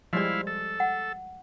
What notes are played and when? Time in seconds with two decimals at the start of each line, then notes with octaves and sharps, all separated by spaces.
0.13 F3 G3 G#3 E4 D5 D#5 F5
0.47 A4
0.80 F#5